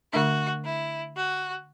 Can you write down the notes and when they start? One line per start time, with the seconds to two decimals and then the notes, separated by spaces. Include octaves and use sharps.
0.13 D3 A3 D4 F#4
0.65 E4
1.16 F#4